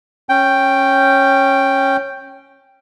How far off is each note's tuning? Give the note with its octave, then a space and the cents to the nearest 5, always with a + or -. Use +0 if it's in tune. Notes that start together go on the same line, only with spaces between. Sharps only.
C#4 -15 G5 +0